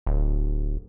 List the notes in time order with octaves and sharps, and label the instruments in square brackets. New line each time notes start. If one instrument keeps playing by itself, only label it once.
[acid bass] D1